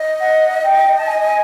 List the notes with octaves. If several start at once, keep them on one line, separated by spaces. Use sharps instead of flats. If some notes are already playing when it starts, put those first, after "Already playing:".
Already playing: D#5
F#5
G5
A5
G#5